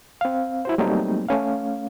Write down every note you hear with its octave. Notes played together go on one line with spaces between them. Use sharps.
C4 F5
E4 F#4 C5
F#3 G3 A3 A#3 C4 D#4
A3 C#4 F5